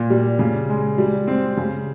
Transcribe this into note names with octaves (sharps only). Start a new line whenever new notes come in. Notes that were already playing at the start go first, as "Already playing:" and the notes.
Already playing: A#2
G3
C#3
G#3
G3
C4
C#3